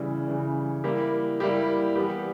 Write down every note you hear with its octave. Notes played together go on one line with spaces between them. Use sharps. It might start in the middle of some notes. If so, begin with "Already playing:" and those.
Already playing: C#3 E3 G3
C#3 E3 G3
G3 A#3 E4 G4
G3 A#3 E4 G4
E3 G3 B3 G4